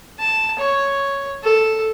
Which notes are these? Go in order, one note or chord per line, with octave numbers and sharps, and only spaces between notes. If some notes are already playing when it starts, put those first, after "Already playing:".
A5
C#5
A4